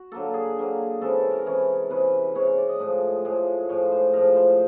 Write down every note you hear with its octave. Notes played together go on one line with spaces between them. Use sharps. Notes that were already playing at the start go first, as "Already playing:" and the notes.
Already playing: F#4
D3 F#3 A#3 A4
G#4
D3 F#3 A#3
C3 E3 G#3 C#4 A4
A#4
C3 E3 G#3 C#4
C3 E3 G#3 C#4 B4
C3 E3 G#3 C#4 C#5
C#5
D5
D#5
A2 F3 G#3
A2 F3 G#3
A2 F3 G#3 C#5
C5
A2 F3 G#3 A#4
C5